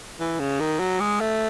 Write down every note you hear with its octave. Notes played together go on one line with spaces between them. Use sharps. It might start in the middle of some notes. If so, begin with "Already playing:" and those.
E3
C#3
D#3
F#3
G#3
A3